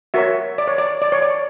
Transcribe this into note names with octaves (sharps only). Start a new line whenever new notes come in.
F#4 A#4 C#5 E5
D5
C#5
D5
D5
C#5
D5